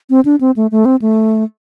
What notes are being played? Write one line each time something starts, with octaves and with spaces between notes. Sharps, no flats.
C4
D4
C4
A3
A3
C4
A3